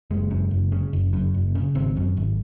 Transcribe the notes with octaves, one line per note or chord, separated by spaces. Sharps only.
F#1 G#3
F#2
F#1
C#3
F#1
F#2
F#1
C#3
G#1 C4
F#2
G#1